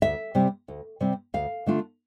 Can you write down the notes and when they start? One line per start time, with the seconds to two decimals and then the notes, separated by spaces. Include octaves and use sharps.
0.02 D2 E5
0.35 C3 G3 C4
0.68 D2
1.00 C3 G3 C4
1.34 D2 F5
1.66 D3 A3 D4 F4